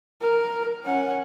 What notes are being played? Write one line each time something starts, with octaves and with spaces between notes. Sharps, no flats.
A#4
C#4 F#5